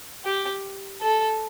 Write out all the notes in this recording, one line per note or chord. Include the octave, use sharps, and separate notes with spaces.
G4
A4